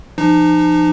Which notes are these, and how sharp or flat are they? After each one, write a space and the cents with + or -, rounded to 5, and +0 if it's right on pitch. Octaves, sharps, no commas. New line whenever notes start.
F3 -30 D#4 -35